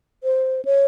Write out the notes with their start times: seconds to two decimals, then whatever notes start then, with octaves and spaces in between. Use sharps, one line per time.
0.24 C5
0.65 C#5